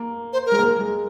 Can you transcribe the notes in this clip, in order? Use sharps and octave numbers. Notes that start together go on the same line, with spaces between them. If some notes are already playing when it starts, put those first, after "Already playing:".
Already playing: A#3
C5
A#4
G#3
A#3
G#3